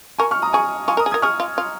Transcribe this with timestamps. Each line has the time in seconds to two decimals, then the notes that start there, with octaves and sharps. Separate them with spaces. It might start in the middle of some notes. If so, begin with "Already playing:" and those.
0.18 A#4 G#5 C#6
0.31 C#6 F6
0.42 A#5 D#6
0.53 G#4 G#5 C#6
0.88 F4 G#5 C#6
0.97 A#4 A#5 D#6
1.06 G#4
1.11 A#4 D#6 G#6
1.22 G#4 C#6 F6
1.40 F4
1.58 F4